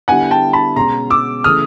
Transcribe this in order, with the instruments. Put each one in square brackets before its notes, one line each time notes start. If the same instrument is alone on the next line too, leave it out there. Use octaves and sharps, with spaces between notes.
[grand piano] D3 G3 B3 E4 [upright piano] F#5 G#5
[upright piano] G5 A5
A5 B5
[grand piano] B2 G#3 C#4 [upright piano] A#5 C6
[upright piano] D6 E6
[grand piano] C#3 E3 A3 [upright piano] D#6 F6